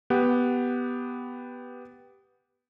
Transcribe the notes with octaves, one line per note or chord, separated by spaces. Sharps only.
B3 G4 F#5